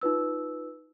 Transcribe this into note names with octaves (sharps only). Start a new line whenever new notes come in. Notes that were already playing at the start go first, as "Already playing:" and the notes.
D#4 F4 B4 E6